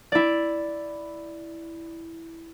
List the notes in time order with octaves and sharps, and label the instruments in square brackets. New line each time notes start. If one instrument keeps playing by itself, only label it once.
[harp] E4 D5